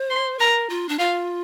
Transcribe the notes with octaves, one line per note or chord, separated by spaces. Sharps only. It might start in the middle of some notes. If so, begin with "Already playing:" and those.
Already playing: C5
C6
A#4 A#5
F4
D4
F4 F5